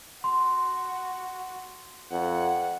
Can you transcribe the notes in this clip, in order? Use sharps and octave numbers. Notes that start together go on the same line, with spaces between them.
F#4 C6
F2 F#5